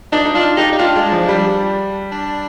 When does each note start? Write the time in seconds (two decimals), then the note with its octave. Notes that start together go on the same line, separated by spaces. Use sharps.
0.12 D4 D#4
0.26 D#4
0.35 D4 F4
0.57 D#4 G4
0.73 D#4
0.79 D4 F4
0.96 G#3
1.12 F3
1.28 G3
2.12 D4